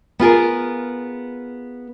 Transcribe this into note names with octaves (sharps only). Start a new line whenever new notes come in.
B3 F4 G#4 A#4